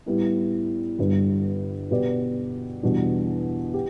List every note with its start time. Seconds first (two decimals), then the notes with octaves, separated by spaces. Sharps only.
0.06 A2 G3 B3 E4
0.99 G1 G2 G3 D4 B4
1.91 B2 B3 G4 B4 D5
2.83 E2 B2 G3 D4
3.74 G4